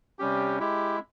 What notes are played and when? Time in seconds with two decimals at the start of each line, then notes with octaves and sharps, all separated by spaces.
0.19 C3 G3 C#4 G4
0.60 G#3 E4 G4